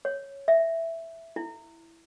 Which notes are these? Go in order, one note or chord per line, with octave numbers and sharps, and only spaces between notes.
C#5
E5
E4